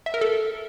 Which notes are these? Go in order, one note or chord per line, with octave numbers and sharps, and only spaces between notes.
E5
A#4
A4